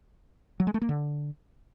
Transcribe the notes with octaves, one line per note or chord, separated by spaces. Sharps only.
F#3
G#3
A3
A#3
D3